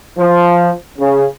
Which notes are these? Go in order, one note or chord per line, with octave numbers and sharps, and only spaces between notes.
F3
C#3